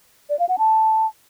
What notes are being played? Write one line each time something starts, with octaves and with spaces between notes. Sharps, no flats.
D5
F5
F#5
A5